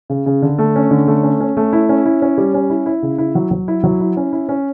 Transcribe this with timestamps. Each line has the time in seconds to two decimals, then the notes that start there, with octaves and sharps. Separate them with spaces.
0.10 C#3
0.26 C#3
0.42 D3
0.59 A3
0.76 C#4
0.91 D3
1.08 A3
1.23 C#4
1.40 C#4
1.57 A3
1.73 E4
1.89 C#4
2.06 E4
2.22 C#4
2.38 G3
2.54 C#4
2.70 E4
2.86 E4
3.02 C#3
3.18 E4
3.35 F#3
3.51 F#3
3.68 E4
3.84 F#3
4.00 E4
4.17 C#4
4.32 E4
4.49 C#4